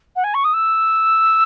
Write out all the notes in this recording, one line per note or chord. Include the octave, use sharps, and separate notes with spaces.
F#5
G#5
C#6
D#6
E6